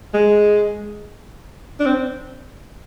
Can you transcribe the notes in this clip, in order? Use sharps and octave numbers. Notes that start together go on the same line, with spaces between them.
G#3
D4
C4